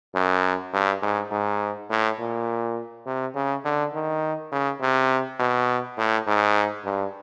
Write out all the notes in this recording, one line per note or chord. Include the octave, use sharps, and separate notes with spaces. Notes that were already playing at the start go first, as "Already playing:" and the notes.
F#2
G2
G#2
G#2
A2
A#2
C3
C#3
D3
D#3
C#3
C3
B2
A2
G#2
G2